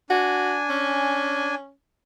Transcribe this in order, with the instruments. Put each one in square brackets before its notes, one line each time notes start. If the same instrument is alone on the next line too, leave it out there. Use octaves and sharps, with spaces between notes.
[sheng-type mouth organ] D4 G#5 [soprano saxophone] F#4
[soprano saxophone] C#4